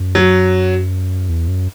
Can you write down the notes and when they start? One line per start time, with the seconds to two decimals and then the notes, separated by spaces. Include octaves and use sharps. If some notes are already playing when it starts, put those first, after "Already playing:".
Already playing: F#2
0.15 F#3
1.29 E2
1.48 F#2